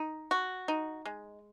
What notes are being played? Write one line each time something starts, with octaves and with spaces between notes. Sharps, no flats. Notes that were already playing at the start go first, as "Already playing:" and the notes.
Already playing: D#4
F#4
D#4
G#3